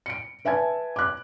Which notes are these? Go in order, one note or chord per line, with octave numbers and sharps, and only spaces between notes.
C#7 D7
B4 E5 G#5 A5 G#6
D6 F#6